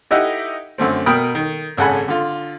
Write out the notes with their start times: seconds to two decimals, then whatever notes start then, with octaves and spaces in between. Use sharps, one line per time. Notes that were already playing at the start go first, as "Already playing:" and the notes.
0.11 D#4 E4 G4 D#5 E5 F#5
0.78 F#2 D3 A3 C4
1.06 B2 A#4 G5 B5 D#6
1.35 D#3
1.77 G#1 C#3 A4 F#5 G#5 B5
2.08 D3 F4